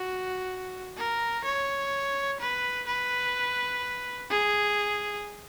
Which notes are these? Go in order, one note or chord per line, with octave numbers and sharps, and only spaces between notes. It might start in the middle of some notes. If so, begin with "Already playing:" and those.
Already playing: F#4
A#4
C#5
B4
B4
G#4